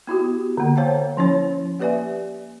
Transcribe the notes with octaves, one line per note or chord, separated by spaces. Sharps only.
B3 E4 F#4 G4
D3 A#3
C5 C#5 F5 G5 A5
F3 C#4 E4 C#5
A#3 G4 B4 D5 E5 G#5